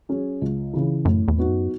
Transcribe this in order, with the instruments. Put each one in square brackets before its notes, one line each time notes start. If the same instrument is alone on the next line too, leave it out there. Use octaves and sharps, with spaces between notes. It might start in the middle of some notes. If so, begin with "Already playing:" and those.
[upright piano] F#3 C#4 G#4
C#2
C#3 E3
[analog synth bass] F#2 [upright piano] A2
[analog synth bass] E2
[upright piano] F#3 B3 D#4 F#4
[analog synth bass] F#2